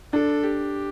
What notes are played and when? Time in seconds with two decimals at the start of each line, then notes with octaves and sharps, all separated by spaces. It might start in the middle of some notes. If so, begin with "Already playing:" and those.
0.13 D4 A4
0.43 G4